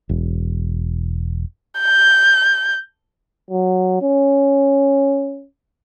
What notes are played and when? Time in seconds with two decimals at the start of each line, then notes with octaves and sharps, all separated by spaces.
0.09 E1
1.80 G6
3.51 F#3
4.02 C#4